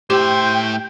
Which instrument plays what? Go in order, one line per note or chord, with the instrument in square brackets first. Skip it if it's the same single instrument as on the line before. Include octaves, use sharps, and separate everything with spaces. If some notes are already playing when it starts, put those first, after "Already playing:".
[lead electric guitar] A2 E5 [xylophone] G4 [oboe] C5 [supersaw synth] G5